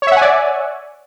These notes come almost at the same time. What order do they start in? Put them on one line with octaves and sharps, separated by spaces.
C#5 E5 F#5 G#5 D5